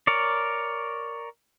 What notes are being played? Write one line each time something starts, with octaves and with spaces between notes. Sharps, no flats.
A#4 C#5 D5